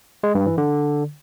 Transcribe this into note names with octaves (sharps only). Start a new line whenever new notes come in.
G#3
G2
E3
D3